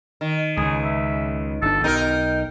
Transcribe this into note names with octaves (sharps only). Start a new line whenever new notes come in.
D#3
C#2 C#3 G#4
E5
G1 D4 A4
B1 D#4 A#4 G5